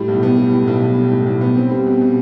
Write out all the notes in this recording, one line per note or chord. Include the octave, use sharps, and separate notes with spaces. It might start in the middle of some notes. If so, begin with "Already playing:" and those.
Already playing: A2 G3
B1
B3
G3
A2
B1
B3
G3
A2
B1
B3
C4
G3
B2
B2